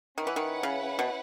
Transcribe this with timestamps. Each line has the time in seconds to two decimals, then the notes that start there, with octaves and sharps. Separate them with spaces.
0.17 D#3 C#4 E4 B4 F#5
0.27 E3
0.36 D#3
0.63 C#3
0.99 B2